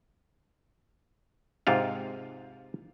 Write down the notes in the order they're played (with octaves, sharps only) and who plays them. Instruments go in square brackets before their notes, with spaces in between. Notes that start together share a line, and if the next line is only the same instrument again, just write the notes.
[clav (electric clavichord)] G#2 C3 F4 F5